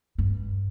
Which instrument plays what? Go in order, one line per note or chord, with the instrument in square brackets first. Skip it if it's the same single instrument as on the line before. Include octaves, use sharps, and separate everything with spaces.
[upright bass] G2